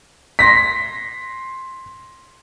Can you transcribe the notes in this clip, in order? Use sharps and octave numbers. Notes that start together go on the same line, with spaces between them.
C6 A#6 B6